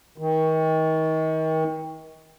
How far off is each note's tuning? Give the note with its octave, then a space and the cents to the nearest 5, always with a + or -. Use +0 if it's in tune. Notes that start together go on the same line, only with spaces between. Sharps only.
D#3 +35